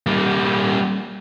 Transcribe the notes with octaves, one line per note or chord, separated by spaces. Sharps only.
G3 A#3